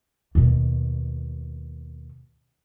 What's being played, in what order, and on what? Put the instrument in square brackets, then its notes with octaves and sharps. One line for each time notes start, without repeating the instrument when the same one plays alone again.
[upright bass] D#2 B2